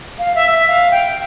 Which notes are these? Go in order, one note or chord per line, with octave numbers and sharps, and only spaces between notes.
F5
E5
E5
F5
G5